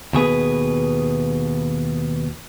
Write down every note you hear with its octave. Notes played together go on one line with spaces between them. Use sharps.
D#2 B2 G#4 B4